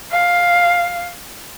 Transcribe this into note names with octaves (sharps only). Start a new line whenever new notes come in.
F5